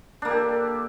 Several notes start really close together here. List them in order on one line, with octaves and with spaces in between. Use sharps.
D4 A#3 A4 G4